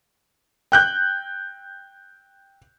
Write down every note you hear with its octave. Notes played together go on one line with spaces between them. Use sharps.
G5 F#6 G6